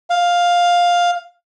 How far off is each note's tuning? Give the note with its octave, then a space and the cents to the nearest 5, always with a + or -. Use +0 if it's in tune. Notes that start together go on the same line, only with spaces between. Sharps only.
F5 +10